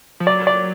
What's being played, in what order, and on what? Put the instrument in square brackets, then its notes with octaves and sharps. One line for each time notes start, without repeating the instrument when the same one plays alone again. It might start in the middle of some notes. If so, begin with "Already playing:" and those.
[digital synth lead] F3
[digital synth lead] F#3 [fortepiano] D5
[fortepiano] D5